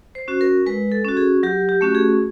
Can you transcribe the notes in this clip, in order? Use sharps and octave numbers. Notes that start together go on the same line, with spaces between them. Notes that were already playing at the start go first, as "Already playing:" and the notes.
C5
C#4 F#4
A#4
G#3 B4
A4
C#4 F#4
G#4
F#3 G4
G4
A3 C#4 F#4
G#4